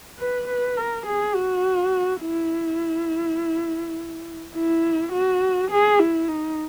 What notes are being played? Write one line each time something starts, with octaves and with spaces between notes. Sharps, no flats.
B4
B4
A#4
G#4
F#4
E4
E4
F#4
G#4
E4
D#4